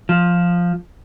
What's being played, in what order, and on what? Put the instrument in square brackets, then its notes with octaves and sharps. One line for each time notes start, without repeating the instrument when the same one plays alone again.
[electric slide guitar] F3